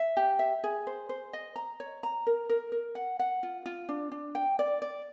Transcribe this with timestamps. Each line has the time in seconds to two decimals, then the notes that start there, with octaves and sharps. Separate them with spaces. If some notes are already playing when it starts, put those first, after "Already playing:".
Already playing: E5
0.17 G4
0.39 E5
0.64 G#4
0.87 C5
1.09 C5
1.33 D#5
1.56 A#5
1.80 C#5
2.03 A#5
2.27 A#4
2.49 A#4
2.72 A#4
2.95 F#5
3.19 F#5
3.43 F4
3.66 F4
3.89 D4
4.12 D4
4.35 G5
4.59 D5
4.82 D5